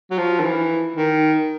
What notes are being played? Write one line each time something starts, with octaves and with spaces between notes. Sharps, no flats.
F#3
F3
D#3
E3
D#3